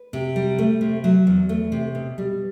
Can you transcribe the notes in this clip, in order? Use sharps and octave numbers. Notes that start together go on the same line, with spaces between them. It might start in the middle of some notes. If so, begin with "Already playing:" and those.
Already playing: B4
C3
G3
A3
C3
F#3
E2
A3
C3
B2
G3